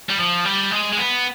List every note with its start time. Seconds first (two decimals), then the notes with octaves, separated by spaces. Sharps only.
0.09 G3
0.19 F3
0.45 G3
0.72 G#3
0.92 G#3
0.98 B3